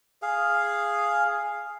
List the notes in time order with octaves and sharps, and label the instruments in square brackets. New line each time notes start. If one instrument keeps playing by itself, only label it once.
[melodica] G#4 F5